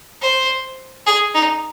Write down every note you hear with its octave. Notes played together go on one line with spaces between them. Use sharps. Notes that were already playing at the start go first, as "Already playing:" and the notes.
C5
G#4
D#4